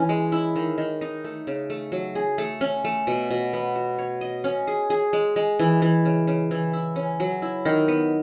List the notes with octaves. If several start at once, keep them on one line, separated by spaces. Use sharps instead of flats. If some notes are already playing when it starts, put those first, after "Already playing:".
Already playing: E3 C#4
G#3
E4
D#3
D#3
D#4
A3
C#3
A3
F#3
G#4
A3
C#4
A3
B2
B2
B3
F#4
C#5
D#5
C#4
G#4
G#4
G#3
G#3
E3
E3
C#3
C#3
E3
E4
C#4
F#3
E4
D#3
B3